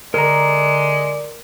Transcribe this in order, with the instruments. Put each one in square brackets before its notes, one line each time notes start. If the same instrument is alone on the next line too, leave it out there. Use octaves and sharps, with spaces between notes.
[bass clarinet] D3 [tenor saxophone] G#3 [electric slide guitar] A#4 A#5 [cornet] D5